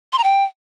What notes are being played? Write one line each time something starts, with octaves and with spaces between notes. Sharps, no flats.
C6
A#5
G5